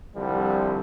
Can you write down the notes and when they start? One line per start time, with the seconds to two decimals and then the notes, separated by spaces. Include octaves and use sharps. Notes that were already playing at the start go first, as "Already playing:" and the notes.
0.15 C2 D3 F3 G3